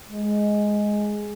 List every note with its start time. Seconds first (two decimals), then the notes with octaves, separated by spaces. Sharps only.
0.10 G#3